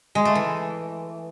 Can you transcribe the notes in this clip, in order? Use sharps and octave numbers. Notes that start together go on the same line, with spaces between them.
G#3
A3
E3